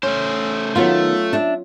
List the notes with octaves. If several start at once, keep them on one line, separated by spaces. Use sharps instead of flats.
A3 C#4 C5
D#3 F#3 A3 B3 F4
D4 E5